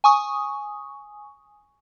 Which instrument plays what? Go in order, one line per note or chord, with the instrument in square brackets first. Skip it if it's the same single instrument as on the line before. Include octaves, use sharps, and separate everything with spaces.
[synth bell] G#5 C#6 D#6